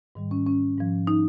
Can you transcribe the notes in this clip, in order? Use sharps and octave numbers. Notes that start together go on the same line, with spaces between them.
G#2 D#3 G3
C#4
C#4
G#2 F3
D#4